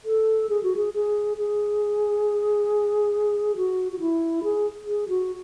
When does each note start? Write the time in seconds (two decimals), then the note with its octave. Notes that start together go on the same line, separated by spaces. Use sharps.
0.05 A4
0.50 G#4
0.63 F#4
0.76 G#4
0.94 G#4
1.38 G#4
3.57 F#4
3.92 F#4
4.00 E4
4.44 G#4
4.87 G#4
5.09 F#4